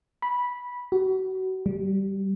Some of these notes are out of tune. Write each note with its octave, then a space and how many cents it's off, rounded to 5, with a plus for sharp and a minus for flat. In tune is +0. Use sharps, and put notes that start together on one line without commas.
B5 -10
F#4 +30
G3 -10